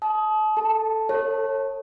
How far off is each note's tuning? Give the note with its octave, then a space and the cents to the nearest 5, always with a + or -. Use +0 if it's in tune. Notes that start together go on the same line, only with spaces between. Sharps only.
A5 -35 D#6 +15
A4 +0 A5 +0
A4 +35 C#5 -25